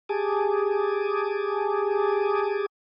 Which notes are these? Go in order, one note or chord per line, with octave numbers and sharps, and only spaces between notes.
G4 G#4 G#5 A5 D6 D#6